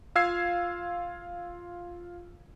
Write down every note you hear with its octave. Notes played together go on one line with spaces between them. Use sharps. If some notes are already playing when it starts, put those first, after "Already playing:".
F4 F5 E6 G#6 C7